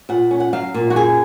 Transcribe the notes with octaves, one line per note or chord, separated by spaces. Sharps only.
A#2 F#5
C#4
F#5
F#3 F5
A#2
F#4
F#2 G#4